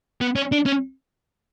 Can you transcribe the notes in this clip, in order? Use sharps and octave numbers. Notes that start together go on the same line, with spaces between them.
B3
C#4
D4
C#4